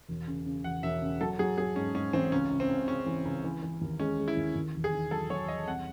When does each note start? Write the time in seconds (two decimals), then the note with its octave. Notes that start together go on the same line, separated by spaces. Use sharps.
0.08 E1
0.27 C#3
0.46 C#3
0.64 E1 F#5
0.83 E1 E5
1.02 C#3
1.21 F#3 A4
1.39 F#3 G#4
1.58 F#3 G#4
1.76 G#2 C#4
1.94 G#2 C#4
2.13 A1 C4
2.32 C#2 C#4
2.51 C#2
2.60 C4
2.69 C#2
2.88 C#3 C#4
3.06 E3
3.25 C#2
3.44 E3
3.62 E3
3.81 D#2
3.99 G#3 C#4
4.19 G#3
4.28 E4
4.37 D#2
4.55 D#2
4.75 E1
4.84 G#4
4.92 D#3
5.11 F#3 A4
5.30 F#3 C#5
5.48 E1 D#5
5.67 C2 F#5